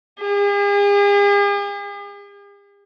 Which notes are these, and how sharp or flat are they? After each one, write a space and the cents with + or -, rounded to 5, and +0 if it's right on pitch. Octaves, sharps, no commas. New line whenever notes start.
G#4 -45